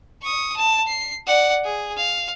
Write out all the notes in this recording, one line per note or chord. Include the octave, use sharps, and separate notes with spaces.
C#6 D#6
A5
C7
D5 F#5
G#4
F5